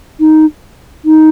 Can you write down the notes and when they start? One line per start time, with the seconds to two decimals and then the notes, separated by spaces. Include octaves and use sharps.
0.20 D#4
1.05 D#4